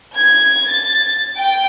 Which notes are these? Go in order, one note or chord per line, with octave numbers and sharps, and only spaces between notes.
G#6
A6
G5